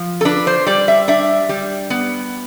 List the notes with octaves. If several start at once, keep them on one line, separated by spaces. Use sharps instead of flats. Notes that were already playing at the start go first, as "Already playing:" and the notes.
Already playing: F3
A4
D4 B4
C5
G3 D5
E5
D4 E5
G3
B3